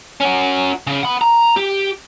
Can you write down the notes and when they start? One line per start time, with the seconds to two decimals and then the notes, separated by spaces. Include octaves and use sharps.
0.20 C#4 F#4
0.87 C#3
1.03 F#5 B5
1.21 A#5
1.56 G4